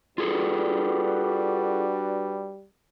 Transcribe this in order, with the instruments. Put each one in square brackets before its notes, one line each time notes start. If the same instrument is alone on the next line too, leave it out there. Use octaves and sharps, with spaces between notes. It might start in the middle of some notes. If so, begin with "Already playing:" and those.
[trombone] G3 [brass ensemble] D4 F#4 B4 [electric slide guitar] F4 G#4 A4